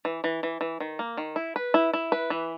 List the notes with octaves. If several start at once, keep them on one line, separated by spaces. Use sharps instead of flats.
E3
E3
E3
E3
D#3
A#3
D#3
E4
B4
E4
E4
B4
E3